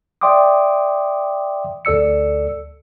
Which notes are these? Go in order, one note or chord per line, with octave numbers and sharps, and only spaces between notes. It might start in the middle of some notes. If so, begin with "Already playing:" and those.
D5 E5 G5 C6 D6 D#6
D2 A4 D5 E6 C#7